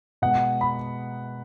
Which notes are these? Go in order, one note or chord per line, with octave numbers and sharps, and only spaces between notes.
B2 G#3 F#5
B5